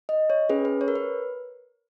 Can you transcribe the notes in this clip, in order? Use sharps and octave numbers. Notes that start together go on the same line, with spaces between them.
D#5
C#5
C#4 G#4 B4
B4
C#5
A#4
B4